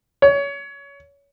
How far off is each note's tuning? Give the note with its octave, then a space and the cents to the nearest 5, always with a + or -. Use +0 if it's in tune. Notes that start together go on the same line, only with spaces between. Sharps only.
C#5 +25